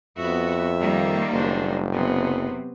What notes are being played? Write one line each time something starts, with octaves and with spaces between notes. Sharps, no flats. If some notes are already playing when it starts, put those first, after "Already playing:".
F2 B3 F#4 E5
D#3 G3 A#3
F#1 D4 C5
C3 F#3 B3